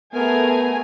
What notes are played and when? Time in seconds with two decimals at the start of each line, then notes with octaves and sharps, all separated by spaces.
0.14 A3 B3 G#4 A#4 G#5 A#5